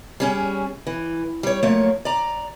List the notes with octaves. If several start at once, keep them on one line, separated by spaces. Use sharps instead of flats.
G3 C#4 G#4
E3
G3 C#5
F#2 F3 A3 A#3 C#5
D5 A#5